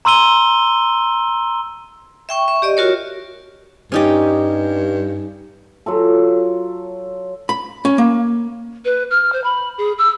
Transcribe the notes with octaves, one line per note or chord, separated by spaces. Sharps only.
A#5 C6 E6 D#7 G7
E5 G5 C#6
E5 C#6
G4 D5 D#5
F4 F#4 A#4 C#5
G2 C#4 D#4 G4
F#3 F4 A4
B5
C#4
A#3
B4
F6
C5
B5
G#4
E6